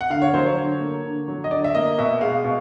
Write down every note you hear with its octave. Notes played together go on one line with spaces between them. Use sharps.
F#5
D3 F5
C#5
F#3 C5
C#5
D3
A#3
D3
F#3
D#5
D3 D5
E5
A#3 D#5
B2 E5
G#3 F5
B2